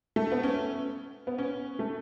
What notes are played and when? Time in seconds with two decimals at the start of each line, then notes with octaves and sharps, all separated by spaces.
0.16 A3
0.32 B3
0.43 C#4
1.27 B3
1.38 C#4
1.79 A3